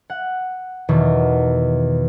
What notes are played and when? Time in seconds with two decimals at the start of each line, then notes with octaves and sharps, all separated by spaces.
0.10 F#5
0.89 E2 B2 D#3